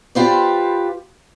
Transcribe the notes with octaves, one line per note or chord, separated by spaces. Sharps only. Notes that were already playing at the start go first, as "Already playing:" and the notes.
F4 G4 B4 C5 D5